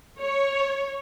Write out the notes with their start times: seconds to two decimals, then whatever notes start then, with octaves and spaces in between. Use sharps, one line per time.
0.20 C#5